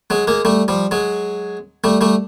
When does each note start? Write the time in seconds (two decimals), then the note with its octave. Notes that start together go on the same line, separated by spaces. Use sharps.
0.10 F#3 G#3
0.27 G#3 A#3
0.45 G3 A3
0.68 F3 G3
0.91 F#3 G#3
1.84 G3 A3
2.01 G3 A3